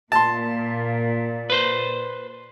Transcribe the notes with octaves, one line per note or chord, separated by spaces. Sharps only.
A#2 A5 C6
B4 C5